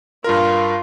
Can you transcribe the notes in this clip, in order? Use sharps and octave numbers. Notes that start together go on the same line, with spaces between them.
G2 F4 A#4